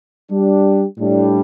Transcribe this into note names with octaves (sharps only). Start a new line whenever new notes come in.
G3 D4 G4
A2 G3 D4